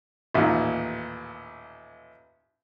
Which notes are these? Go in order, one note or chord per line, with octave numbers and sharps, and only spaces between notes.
A1 D#2 A#2